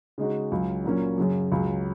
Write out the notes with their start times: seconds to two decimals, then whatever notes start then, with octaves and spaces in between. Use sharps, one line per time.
0.18 C#3 G#3 D#4 F#4
0.51 C#2 C#3 F#3
0.84 A#2 F#3 A#3 C#4
1.18 F#2 C#3 F#3
1.51 C#2 C#3 F#3